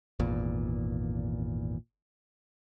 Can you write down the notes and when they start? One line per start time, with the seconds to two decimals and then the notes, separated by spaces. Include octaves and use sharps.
0.20 G#1 E2 A#2